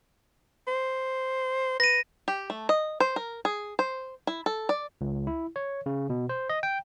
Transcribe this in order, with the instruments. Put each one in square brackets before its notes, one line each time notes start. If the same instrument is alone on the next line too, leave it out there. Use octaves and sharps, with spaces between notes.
[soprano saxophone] C5
[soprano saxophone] B4 [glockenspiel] A#6 D#7
[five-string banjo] G4
A3
D#5
C5
A#4
G#4
C5
E4
A4
D5
[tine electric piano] C#2
E4
C#5
C#3
B2
C5
D#5
G5